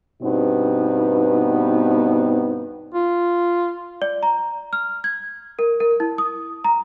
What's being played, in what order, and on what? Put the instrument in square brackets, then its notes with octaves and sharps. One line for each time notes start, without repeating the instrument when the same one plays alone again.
[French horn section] G2 B2 B3 C4 D#4
[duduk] F4
[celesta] D5
A#5
F6
G#6
A#4
A#4
E4
D#6
A#5